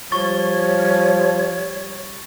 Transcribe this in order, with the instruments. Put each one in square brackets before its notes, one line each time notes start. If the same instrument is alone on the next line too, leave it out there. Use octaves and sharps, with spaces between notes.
[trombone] F3 [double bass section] G3 [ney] C#5 [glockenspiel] C#6 A6